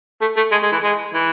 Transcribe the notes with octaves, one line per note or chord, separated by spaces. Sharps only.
A3
A3
G#3
G#3
E3
G#3
E3